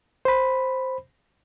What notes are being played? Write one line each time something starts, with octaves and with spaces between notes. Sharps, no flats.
C5 B5